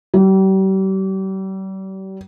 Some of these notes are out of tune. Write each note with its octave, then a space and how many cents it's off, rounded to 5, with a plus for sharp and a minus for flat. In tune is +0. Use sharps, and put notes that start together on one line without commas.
G3 -40